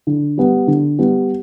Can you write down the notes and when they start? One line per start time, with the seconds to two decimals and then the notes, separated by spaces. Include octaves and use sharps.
0.07 D3
0.38 G3 B3
0.68 D3
0.99 G3 B3